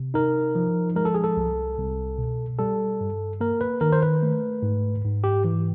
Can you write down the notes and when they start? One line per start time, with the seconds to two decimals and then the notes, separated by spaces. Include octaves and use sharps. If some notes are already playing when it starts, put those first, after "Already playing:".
Already playing: C3
0.14 D#4 A#4
0.55 F3
0.96 G#3 A#4
1.05 A4
1.14 G#4
1.24 A4
1.37 C2
1.78 C2
2.18 B2
2.59 G3 A4
3.01 G2
3.41 A#3 A#4
3.61 B4
3.81 D#3 A#4
3.92 C5
4.03 B4
4.23 A3
4.62 G#2
5.04 G#2
5.24 G4
5.44 E3